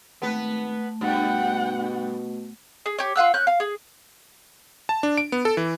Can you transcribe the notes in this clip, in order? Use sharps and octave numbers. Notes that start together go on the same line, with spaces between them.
G#1 A3 B3 B4
G2 B2 F#5 G5
G#4
G4 C#5
F4 F5 F#5 E6
C#4 F#6 G6
F5
G#4
A5
D4
D7
B3
A4
E3